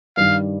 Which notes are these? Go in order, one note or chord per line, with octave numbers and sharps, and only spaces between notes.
G2 D#3 G3 F5